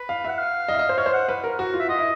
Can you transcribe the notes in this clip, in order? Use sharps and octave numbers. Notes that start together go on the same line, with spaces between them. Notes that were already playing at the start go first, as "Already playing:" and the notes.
Already playing: B4
F5
E5 F#5
F5
D#5
E5
D#5
C5
C#5 F5
C5
F#5
B4
A#4
F#4
F4
E5
F4 D#5
E4